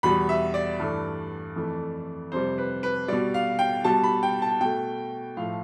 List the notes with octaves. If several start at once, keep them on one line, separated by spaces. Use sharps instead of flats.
E2 B2 G3 B5
E5
D5
G2 E3 A3
F2 E3 A3
F2 C3 G3 C5
B4
B4
B2 G3 D5
F5
G5
B2 G3 A5
B5
G5
A5
B2 A3 G5
A2 F3 A3 F5